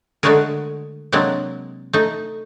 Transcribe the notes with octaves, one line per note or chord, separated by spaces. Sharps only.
D3 G#3 A3 F#4 G#4 A#4
C3 F#3 G#3 A#3 C4 D4
A3 D#4